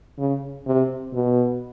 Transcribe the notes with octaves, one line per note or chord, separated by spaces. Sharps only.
C#3
C3
B2